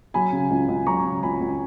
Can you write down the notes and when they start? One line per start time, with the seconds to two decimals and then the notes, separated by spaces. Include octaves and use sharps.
0.14 F#3 G#5 B5
0.32 C#3
0.51 C#2
0.68 C#2
0.86 F#3 A#5 C#6
1.05 C#3
1.23 C#2 G#5 B5
1.41 C#2